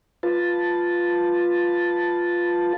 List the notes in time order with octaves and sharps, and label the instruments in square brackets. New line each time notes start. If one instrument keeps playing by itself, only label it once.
[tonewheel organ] F4 B4 A5